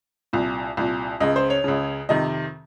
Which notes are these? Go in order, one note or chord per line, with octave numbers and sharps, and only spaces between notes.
C2 A#2
C2 A#2
C#2 C#3 D#5
C5
C#5
C#2 C#3
F2 C3 D#3 D#5